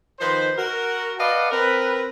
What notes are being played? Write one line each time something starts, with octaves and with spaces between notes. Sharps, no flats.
D#3 F3 D#4 B4 C5
F#4 A#4
B4 D5 D#5 F5 F#5 A5
C4 A#4 B4